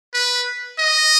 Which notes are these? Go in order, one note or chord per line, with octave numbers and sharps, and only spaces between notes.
B4
D#5